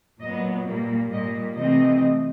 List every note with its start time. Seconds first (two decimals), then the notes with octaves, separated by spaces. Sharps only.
0.21 A#2 F#3 B3 D#5
0.67 A#2 G3 A#3
1.12 A#2 G3 A#3 D#5
1.58 C3 E3 A3 C4 D#5